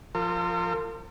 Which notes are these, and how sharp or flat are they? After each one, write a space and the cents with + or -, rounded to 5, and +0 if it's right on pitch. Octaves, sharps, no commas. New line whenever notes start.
F3 +0 A#4 -45